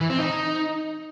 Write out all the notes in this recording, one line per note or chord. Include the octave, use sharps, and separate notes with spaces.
E3
C4
D#4